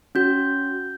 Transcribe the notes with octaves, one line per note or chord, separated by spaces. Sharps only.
C#4 F#4 G6